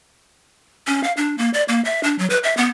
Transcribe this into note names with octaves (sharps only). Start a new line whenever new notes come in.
C#4
F5
D4
A#3
D5
A#3
E5
D4
F#3
B4
E5
B3